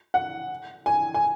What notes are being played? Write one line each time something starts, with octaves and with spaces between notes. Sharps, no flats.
F#5
G#5
G#5